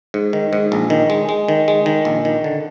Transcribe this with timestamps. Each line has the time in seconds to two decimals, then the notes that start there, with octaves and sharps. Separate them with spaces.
0.14 G#2
0.33 D#3
0.53 G#2
0.72 A#1
0.90 D#3
1.10 G#3
1.29 G#3
1.48 D#3
1.68 G#3
1.86 D#3
2.05 A#1
2.25 D#3
2.44 D3